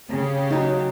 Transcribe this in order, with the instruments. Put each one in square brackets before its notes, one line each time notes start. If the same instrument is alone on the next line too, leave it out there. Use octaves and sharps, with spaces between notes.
[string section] C#3 G4
[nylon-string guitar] F#3 D#4